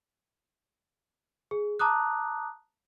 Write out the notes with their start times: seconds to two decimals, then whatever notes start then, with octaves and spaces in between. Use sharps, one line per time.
1.51 G#4
1.79 A5 A#5 D6 D#6 F#6